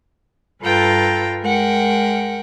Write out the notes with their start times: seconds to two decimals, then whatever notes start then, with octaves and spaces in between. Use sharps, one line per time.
0.62 G2 F4 A4 B4 G5 A#5
1.41 G#3 A#4 F#5 G5